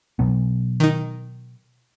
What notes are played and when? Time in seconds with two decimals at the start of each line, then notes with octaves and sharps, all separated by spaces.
0.19 B2 F#3 B3
0.80 D#3 D#4